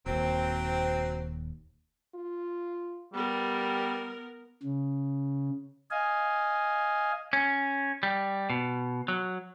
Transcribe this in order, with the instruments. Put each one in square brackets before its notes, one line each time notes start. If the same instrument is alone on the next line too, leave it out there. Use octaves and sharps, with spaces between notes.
[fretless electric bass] D#1 D#2 [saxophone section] F#3 C4
[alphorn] F4
[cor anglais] G3 [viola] B3 A#4 [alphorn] G4
[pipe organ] C#3
D#5 F5 G#5
[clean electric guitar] C#4
G3
B2
F#3